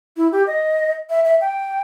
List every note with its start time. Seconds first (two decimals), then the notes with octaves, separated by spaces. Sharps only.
0.17 E4
0.32 G4
0.47 D#5
1.10 E5
1.25 E5
1.41 G5